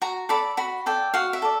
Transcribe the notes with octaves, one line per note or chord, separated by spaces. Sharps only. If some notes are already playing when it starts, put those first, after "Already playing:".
F#4 A#5
A4 D5 B5
F#4 B5
A4 D5 G5
F#4 F5
E5
A4 D5